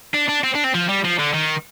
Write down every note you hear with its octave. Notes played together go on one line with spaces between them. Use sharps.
D4
D4
C4
D4
C4
F3
G3
F3
D3
D#3